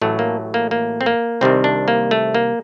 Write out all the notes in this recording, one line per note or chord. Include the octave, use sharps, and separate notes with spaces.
A1 A2 F#3 A3
A#3
A#3
A#3
C4
A#3
C2 C3 D#3 G3 C4
D4
A#3
A3
A#3